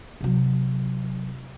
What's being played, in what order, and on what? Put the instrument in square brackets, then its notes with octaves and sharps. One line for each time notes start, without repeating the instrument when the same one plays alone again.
[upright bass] C3 F#3